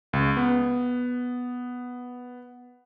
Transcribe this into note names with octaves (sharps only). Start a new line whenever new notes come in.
C#2
B3